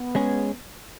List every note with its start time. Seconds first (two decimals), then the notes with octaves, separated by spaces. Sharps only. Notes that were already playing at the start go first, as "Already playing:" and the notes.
Already playing: B3
0.15 G#3 C#4 G#4